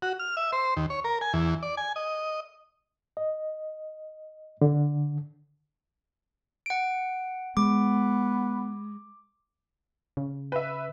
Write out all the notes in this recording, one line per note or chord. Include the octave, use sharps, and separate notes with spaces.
F#4
F6
E5
C5
D#2
C#5
A#4
G#5
E2
D5
G#5
D#5
D#5
D3
F#5 D7
G#3 B3 D6
C#3
B4 E5